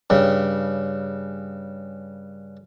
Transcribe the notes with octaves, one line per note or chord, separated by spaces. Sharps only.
G2 C#3